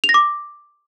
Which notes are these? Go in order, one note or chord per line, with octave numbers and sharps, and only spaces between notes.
F7
A#6
D6